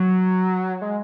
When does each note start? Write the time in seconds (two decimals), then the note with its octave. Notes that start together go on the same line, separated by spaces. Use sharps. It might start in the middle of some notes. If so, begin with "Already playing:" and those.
Already playing: F#3
0.82 G#3